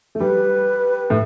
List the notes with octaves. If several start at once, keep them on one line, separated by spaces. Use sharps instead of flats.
A3
G3 B4
A2